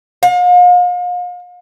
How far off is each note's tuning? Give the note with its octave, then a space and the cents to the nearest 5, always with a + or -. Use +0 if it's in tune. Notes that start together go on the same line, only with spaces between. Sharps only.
F5 +40